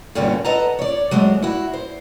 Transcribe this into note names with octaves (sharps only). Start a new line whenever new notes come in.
G2 B2 D3 G3 A#3 C#4
A4 B4 D#5 F#5 A5 A#5
C#5 D5
F#3 G#3 A3 C4
E4 F#4
C5